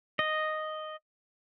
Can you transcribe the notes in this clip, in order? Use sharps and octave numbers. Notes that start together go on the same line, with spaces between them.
D#5